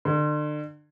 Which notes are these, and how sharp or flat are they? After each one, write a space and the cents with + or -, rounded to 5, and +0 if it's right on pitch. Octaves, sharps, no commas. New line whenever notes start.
D3 +40